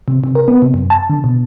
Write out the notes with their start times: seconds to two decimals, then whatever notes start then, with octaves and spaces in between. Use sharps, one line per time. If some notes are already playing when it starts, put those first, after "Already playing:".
0.08 C3
0.24 C3
0.35 A#4
0.48 B3
0.62 C3
0.74 F#2
0.90 A5
1.10 D3
1.24 B2